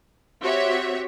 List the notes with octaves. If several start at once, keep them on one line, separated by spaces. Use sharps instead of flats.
C4 F#4 G4 C#5 E5